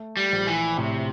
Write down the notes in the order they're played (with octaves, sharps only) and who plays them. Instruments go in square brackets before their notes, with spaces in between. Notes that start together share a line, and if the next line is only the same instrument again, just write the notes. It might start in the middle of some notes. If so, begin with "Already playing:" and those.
Already playing: [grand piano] A3
[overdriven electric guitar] G3
[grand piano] A#1
[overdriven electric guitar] E3
[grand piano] A2 [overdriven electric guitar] C3